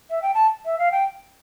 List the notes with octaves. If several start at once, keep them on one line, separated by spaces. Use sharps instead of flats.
E5
G5
A5
E5
F5
G5